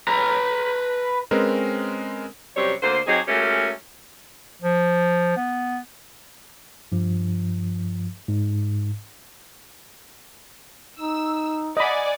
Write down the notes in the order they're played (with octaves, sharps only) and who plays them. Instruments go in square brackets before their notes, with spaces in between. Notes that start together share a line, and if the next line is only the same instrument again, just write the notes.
[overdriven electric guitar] B4 A#5
[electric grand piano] G#3 C4 C#4 A#4 B4
[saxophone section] F#2 C3 G3 C4 C#5
D2 D3 A#3 C5
F#3 C4 D#4 G4 G#4
G#3 A3 C#4 F#4 G4 A#4
[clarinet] F3
B3
[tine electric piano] G2 F3
G#2
[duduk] D#4 [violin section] E6
[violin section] D5 F#5 G#5 [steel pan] D#5 B5